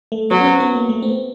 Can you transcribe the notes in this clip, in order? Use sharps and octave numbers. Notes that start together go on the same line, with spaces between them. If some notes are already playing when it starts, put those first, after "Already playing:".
A3
F#3 B3
C#4
C4
B3
A#3
A3
C4
B3